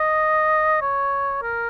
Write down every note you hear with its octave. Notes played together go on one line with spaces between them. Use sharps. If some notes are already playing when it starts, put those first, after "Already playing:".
Already playing: D#5
C#5
A#4